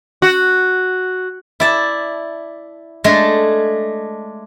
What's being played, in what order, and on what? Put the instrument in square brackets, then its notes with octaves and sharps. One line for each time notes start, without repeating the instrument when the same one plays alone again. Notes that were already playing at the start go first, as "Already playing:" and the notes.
[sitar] F#4
[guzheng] E4 D5 A5
G#3 A3 D4 G#4